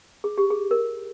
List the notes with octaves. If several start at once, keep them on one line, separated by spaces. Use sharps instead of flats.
G#4
G4
G#4
A#4